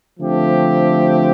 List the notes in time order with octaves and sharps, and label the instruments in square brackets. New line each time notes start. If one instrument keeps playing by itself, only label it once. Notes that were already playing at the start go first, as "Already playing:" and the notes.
[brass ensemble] D3 F3 A3 C4 G4